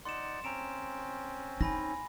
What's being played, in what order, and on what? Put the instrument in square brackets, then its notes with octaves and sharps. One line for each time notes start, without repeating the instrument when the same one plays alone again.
[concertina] D#4 D5 F#5 [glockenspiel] C6 E7
[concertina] C4 C#4 [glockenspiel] A#5 D7 E7
[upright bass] D#4 [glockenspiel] G#5 B5 A#6